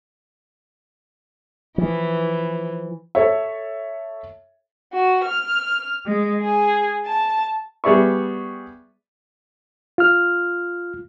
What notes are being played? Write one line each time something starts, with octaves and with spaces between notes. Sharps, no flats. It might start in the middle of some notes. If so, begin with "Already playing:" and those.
E3 F3
A4 C#5 E5
F#4
F6
G#3
G#4
A5
G3 B3 G#4 D5 E5 C#6
F4 F6